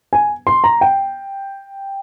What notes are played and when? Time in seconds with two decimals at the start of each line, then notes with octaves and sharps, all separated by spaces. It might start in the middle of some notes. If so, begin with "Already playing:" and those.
0.13 G#5
0.47 C6
0.64 A#5
0.81 G5